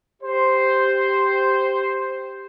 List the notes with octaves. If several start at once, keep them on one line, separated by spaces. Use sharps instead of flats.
G4 C5